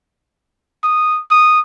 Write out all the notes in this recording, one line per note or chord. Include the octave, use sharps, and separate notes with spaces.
D#6
D#6